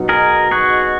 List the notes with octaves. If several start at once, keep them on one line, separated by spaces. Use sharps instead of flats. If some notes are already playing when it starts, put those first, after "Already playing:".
Already playing: B2 F#3 B3 D#4
G#4 A#4
F#4 G#4